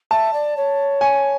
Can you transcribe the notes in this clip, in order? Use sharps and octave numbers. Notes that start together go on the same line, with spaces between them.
E5 A5
D5
C#5
G#5